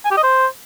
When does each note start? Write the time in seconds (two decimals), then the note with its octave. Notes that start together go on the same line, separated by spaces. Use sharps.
0.05 G#5
0.11 G4
0.17 D#5
0.23 C5